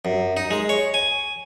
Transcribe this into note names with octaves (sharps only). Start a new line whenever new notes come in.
F#2
D#4
G#3
C#5
G#5